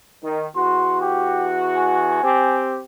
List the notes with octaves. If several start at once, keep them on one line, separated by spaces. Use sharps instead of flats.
D#3
E2 F#4 C6
G4
G#5
C4 G4